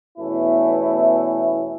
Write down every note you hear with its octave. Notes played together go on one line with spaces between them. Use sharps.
E2 B2 A3 C#4 E4